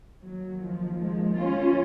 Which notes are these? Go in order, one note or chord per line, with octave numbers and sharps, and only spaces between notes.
D#2 D#3 F#3
F3
F3 G#3
C#4 F4